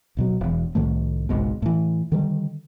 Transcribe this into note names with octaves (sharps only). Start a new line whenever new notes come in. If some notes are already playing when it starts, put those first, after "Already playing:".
D1 B2 F#3
E1 E2
C2 A2 D#3 A3
G#1 C#2 G#2 B2
A2 E3
D3 D#3 G3